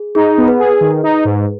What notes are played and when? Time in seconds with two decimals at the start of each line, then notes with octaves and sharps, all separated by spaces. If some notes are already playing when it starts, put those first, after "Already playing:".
Already playing: G#4
0.15 D#4 G#4
0.38 B3
0.48 B4
0.59 G#4
0.81 D#3
1.03 D#4
1.25 G#2